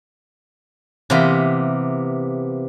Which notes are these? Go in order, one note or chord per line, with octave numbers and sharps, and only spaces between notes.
C3 E3 A#3 B3 A#4 C6